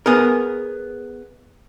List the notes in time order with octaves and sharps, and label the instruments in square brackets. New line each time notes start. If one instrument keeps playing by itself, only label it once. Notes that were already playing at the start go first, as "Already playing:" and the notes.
[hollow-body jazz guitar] B3 G#4 A#4